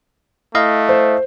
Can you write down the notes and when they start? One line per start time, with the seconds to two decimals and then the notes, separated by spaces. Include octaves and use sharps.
0.55 A3 E4 D#5 F5
0.89 C5